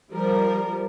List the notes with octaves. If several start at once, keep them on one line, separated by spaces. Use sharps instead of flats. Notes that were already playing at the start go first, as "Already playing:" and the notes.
F3 G3 A#4